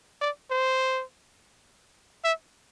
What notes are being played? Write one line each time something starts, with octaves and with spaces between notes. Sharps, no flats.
D5
C5
E5